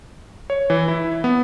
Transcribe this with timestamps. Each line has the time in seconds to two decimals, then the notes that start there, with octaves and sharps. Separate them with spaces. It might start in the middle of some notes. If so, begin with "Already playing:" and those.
0.50 C#5
0.70 E3
0.88 E4
1.24 B3